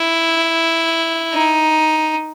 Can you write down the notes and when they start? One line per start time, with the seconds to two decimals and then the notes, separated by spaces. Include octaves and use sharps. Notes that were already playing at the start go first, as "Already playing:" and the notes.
Already playing: E4
1.34 D#4